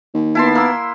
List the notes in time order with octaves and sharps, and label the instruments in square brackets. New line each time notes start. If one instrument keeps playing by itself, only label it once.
[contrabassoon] D#2
[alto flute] B3 [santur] E4 A5 C6
[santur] A#3 E6